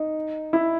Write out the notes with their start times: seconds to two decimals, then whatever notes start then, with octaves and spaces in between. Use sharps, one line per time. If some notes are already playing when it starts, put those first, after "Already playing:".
Already playing: D#4
0.53 E4